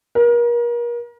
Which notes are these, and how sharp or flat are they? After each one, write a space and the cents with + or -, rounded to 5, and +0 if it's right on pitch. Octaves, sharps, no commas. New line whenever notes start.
A#4 +35